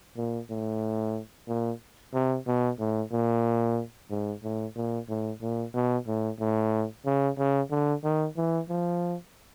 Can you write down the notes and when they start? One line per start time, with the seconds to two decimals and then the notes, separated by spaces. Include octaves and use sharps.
0.17 A#2
0.50 A2
1.48 A#2
2.14 C3
2.47 B2
2.79 A2
3.12 A#2
4.10 G#2
4.43 A2
4.76 A#2
5.09 A2
5.42 A#2
5.74 B2
6.07 A2
6.40 A2
7.06 C#3
7.38 C#3
7.71 D3
8.04 D#3
8.37 E3
8.69 F3